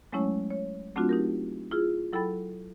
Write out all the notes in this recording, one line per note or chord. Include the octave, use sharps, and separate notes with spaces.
F#3 G#3 A3 C#4 E4 C#5
C#5
F#3 A3 C4 D4 F4 F#4
D#4 G4 A#4
E4 F4 G#4
F#3 E4 A4 G5 B5 A6